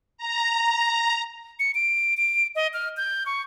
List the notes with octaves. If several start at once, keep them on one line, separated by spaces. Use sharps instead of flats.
A#5
C#7
D7
D7
D#5
F6
G6
C#6